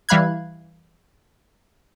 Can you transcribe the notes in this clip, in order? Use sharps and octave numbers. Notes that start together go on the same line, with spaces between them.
E3 G3 F5 B5 F#6 G#6